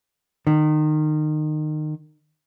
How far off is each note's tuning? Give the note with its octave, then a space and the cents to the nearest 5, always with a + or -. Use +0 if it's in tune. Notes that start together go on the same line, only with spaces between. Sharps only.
D#3 -25